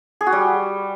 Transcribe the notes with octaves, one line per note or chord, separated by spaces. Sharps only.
G#4
F#4
G3